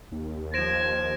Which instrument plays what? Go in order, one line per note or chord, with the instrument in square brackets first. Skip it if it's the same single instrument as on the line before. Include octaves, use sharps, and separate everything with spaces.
[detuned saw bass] D#2
[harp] F3 C5 [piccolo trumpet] G#6 [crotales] A#6 D7 E7